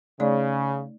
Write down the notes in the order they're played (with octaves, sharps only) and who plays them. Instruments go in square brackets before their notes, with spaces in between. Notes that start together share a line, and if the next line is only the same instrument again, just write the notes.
[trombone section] C#3 [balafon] A3 D#4 D5